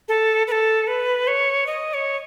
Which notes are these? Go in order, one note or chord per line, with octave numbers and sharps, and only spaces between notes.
A4
B4
A4
B4
C#5
D#5
C#5